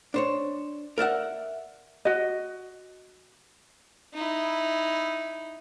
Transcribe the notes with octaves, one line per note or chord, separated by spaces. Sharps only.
D4 C5 C#5
A#4 D5 E5 F#5
F#4 D#5
D#4 E4